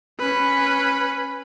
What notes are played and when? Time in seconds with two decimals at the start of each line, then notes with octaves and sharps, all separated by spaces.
0.20 C#4 B4